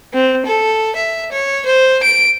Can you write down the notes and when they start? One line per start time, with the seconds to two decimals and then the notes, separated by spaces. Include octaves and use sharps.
0.14 C4
0.46 A4
0.96 E5
1.32 C#5
1.66 C5
2.03 D7